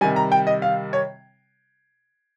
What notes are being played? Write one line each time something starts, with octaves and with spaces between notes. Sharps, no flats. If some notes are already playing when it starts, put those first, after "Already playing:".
C3 D#3 G3 G#5
A#5
G5
D#5
F5
C#5